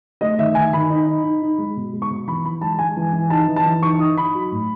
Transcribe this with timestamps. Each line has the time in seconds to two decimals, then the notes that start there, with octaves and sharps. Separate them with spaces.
0.21 A3 D#5
0.39 D#3 E5
0.55 D#3 G#5
0.73 D#3 B5
0.90 D#4
1.07 D#4
1.24 D#4
1.42 D#4
1.58 G#3
1.77 B2
1.93 G#3
2.02 C#6
2.10 B2
2.27 E3 B5
2.45 E3 B5
2.61 G#3 A5
2.79 G#3 G#5
2.97 E3
3.13 E3
3.30 D#4 A5
3.47 E3
3.56 A5
3.66 E3
3.82 D#4 C#6
3.99 D#4 D#6
4.17 D#4 B5
4.35 F#3
4.52 A2